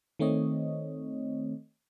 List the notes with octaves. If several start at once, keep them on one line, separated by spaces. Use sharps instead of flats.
D#3 A3 C4 C#5 D#5